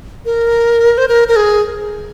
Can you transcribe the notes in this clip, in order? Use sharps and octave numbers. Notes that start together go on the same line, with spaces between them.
A#4
C5
A#4
A#4
G#4